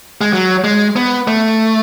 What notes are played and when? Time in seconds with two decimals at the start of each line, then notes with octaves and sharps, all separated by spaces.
0.21 G#3
0.33 F#3
0.64 G#3
0.96 B3
1.27 A3